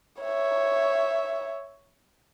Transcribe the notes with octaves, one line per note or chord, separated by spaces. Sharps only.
C#5 E5